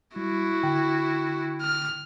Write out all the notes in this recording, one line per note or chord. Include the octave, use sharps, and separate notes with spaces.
G3 E4 F#4
D3 G5
F6